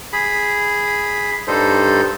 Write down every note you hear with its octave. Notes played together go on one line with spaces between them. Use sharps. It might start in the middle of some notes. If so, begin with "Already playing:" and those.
G#4 B5
G2 G3 D#4 A4 C5